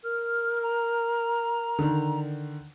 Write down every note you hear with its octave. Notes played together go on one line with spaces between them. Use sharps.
A#4 F6
A#5
D3 D#3